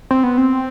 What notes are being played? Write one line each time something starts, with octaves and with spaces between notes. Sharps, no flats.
C4
B3
C4